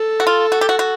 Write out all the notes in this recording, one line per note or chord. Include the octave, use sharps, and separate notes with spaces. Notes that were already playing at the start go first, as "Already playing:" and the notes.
Already playing: A4
F#4
F4
F#4
G4
F#4
F#4